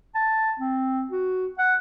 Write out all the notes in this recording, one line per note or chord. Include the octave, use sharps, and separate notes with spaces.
A5
C4
F#4
F#5